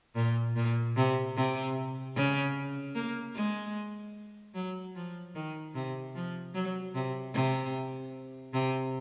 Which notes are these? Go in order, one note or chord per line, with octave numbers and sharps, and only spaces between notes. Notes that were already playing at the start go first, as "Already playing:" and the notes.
A#2
A#2
C3
C3
C#3
A#3
G#3
F#3
F3
D#3
C3
F3
F#3
C3
C3
C3